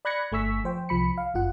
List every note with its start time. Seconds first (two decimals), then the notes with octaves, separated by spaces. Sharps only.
0.05 D5 B5 F#6 G#6 A#6 C#7
0.32 G1 A3 G#5 C#6 E6 B6
0.64 F3 C5 G5
0.89 C2 F3 B5 C#7
1.18 F5
1.34 G1 F#2 F4 F#5